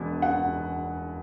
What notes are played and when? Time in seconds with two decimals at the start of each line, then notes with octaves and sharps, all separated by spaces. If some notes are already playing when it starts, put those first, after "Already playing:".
Already playing: E1 E2 B2 B3
0.22 F#5